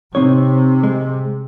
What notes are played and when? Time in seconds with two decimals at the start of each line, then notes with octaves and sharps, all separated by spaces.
0.15 C3 C4 D#4 C#5
0.83 G#3